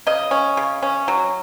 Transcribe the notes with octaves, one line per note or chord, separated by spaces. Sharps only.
C#3 D#5
C#4
C#3
C#4
F#3